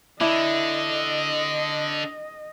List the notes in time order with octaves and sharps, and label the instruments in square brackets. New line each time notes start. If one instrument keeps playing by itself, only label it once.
[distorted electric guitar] D3 [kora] D4 E4 [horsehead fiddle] D#5